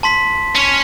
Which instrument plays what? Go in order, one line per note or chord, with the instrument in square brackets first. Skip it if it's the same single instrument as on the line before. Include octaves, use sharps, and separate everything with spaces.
[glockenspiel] A5 C6 B6
[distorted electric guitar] C#4 C#5